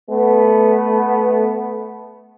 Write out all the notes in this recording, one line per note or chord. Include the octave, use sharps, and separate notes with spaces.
A3 B3